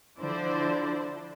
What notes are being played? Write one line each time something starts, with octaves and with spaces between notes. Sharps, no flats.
D3 F3 D4 E4 C5 D5